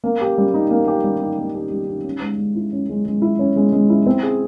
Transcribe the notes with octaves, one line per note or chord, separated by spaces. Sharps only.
A#3
G4
G3
D#4
A#3
G4
G3
D#4
A#3
G4
G3
D#4
C#4
G#3
G#3
E4
C#4
G#3
G#3
E4
C#4
G#3
G#3
E4
C4
G#4